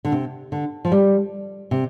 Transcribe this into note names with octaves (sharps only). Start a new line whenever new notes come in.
D3
C3
D3
F3
G3
C3